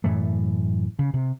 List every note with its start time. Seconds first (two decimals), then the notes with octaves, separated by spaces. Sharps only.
0.04 F#2 A2 E3 A3
0.99 C#3
1.14 C3